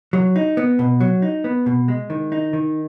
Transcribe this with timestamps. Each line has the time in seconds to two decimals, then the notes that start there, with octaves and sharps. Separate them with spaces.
0.13 F#3
0.36 D#4
0.57 B3
0.79 B2
1.01 F#3
1.22 D#4
1.44 B3
1.66 B2
1.88 G#3
2.10 D#3
2.32 D#4
2.53 D#3